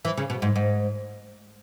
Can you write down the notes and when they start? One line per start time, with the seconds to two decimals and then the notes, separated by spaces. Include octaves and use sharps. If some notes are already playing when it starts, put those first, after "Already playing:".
0.05 E3
0.17 C#3
0.30 B2
0.42 G#2
0.56 G#2